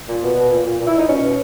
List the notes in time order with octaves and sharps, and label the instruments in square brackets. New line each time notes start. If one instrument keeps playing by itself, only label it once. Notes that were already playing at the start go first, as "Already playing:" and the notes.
[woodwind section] A#2
B2 B3
B2
A#2
A#2
A#2
E4
A#2 D#4
B2 C#4
B2